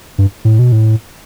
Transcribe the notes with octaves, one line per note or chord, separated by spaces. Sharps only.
G2
A2
B2
A2